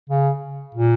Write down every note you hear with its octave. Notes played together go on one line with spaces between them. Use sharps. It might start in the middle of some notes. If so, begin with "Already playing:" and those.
C#3
A#2